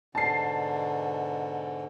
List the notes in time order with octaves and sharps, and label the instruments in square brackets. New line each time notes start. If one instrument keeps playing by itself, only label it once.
[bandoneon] G#2 B2 D3 [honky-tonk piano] A5 C7